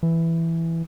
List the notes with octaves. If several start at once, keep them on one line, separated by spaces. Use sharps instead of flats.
E3